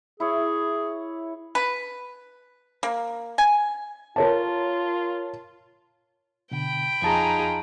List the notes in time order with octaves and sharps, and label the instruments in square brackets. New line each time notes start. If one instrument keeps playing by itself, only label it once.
[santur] E4 C#5 [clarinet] G#4
[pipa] B4
A#3
G#5
[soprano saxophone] F4 [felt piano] A#4 C#5 A5
[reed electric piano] B2 D3 [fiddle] G5 B5
[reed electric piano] F2 A5 A#5 [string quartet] D#4 F4 [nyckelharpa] G#4